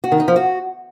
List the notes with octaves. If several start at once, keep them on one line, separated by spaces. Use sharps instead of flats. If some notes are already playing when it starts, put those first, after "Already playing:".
F#4
D#3
D#4
F3
F#4